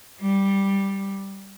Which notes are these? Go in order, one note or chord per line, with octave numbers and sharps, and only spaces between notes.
G3